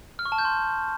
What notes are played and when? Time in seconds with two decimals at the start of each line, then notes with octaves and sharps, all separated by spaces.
0.19 F6
0.25 C#6
0.32 A5
0.38 G6
0.45 C6